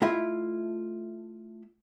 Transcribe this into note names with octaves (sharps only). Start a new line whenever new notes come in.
A3 E4 F4 D#5 E5